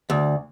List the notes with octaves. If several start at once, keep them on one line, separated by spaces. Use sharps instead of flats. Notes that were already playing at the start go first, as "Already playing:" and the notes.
D2